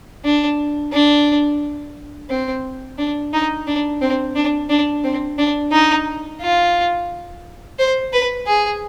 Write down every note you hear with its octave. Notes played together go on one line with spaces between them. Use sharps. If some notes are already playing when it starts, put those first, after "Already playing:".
D4
D4
C4
D4
D#4
D4
C4
D4
D4
C4
D4
D#4
F4
C5
B4
G#4